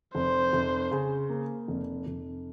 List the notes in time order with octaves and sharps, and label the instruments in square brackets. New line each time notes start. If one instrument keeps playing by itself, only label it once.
[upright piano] F1 [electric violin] C5
[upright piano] F1
C#3
A#3
F1
F1